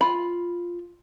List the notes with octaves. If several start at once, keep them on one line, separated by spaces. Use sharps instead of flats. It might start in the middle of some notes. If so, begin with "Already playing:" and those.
F4 B5